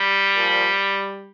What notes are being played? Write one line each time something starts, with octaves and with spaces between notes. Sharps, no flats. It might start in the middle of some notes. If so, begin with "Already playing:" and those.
Already playing: G3
A#2 F3